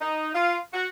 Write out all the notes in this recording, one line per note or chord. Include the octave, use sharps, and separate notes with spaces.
D#4
F4
F#4